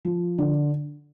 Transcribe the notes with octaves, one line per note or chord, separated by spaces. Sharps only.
F3
D3